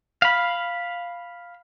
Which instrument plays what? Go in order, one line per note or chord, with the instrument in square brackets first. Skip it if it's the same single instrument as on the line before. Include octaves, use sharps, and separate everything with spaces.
[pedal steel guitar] F5 B5